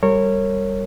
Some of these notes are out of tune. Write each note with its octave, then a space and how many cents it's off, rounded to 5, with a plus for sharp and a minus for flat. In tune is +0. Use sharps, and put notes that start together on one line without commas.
G3 +0 A#4 -30 C#5 -15